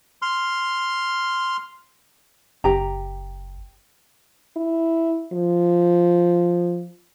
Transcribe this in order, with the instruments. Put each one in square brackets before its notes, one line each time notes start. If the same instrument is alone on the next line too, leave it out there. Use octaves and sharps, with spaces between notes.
[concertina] C6 F6
[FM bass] F#1 [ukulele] G4 A#5
[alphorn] E4
F3